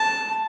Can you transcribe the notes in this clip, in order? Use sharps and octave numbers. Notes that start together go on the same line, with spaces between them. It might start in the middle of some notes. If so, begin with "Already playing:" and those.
Already playing: A5